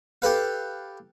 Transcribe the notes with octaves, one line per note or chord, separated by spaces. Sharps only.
G4 A4 B4 F5